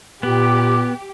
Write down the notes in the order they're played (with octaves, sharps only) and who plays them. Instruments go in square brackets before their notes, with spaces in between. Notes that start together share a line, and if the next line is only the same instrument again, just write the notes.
[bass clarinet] A#2 [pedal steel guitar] B3 [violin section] G4 [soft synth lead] D6